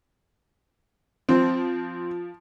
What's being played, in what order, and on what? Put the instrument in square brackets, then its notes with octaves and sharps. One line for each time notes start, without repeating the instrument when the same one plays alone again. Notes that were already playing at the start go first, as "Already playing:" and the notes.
[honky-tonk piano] F3 [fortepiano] C4